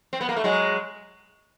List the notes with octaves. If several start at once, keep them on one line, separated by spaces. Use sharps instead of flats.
C4
B3
A#3
A3
F#3 G#3